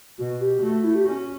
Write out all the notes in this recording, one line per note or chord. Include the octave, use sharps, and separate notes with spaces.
B2 F#4
G4
A3 F#4
E4
G4
C#4 F#4